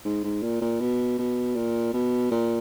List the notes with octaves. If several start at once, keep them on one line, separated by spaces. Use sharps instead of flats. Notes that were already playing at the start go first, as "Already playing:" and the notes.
G#2
G#2
A#2
A#2
B2
B2
A#2
B2
A#2